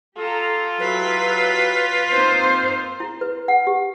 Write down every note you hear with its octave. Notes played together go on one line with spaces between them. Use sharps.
F4 G4 A4 A#5
F#3 E4 G4 B4
A#3 C4 D#4 C5
E4
B4
F#5
G4